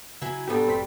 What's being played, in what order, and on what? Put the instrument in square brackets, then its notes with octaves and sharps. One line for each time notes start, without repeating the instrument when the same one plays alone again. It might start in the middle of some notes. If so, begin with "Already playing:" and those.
[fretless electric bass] C#3 [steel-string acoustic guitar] F#3 E4 G#5
[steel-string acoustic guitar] G#2 B2 G3 [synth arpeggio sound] B3 G4 [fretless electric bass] D4 [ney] A4
[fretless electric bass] F1 [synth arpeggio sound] C4 B6